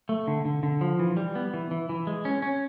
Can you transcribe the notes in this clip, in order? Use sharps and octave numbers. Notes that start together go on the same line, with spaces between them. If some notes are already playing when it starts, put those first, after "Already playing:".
A3
D3
D3
D3
F3
E3
G3
B3
E3
E3
E3
G#3
C#4
C#4